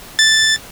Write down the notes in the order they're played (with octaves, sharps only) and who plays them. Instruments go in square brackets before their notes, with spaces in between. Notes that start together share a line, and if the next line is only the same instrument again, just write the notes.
[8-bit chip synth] A6